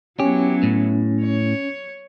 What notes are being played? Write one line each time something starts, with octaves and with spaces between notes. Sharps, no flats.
F#3 B3 C#4 E4 G4
A2
C#5